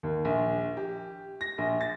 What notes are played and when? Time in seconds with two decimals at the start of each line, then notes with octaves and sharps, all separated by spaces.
0.03 D#2
0.25 A#1
0.77 G4
1.41 A#6
1.58 A#1
1.81 A6